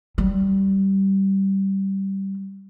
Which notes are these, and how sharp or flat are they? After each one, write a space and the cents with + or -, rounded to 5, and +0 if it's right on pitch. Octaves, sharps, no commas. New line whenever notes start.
G3 -15